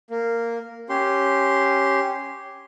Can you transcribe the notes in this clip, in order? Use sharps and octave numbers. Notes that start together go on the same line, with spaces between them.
A#3
C#4 G4 C6